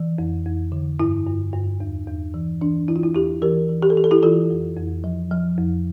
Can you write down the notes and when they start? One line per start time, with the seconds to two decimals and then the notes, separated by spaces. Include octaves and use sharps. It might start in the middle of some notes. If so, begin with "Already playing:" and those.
Already playing: E3
0.18 F2
0.46 F2
0.72 D3
1.00 G2 E4
1.26 G2
1.53 G2
1.80 E2
2.07 E2
2.34 E3
2.61 E3 D4
2.88 E3 E4
2.96 F4
3.03 E4
3.15 E2 E4 G4
3.42 E3 G4 A#4
3.69 E3
3.82 G4
3.90 A4
3.96 E3 G4
4.04 A4
4.11 E4 G4
4.23 E3 F4 A4
4.50 F2
4.77 F2
5.04 F3
5.32 F3
5.58 F2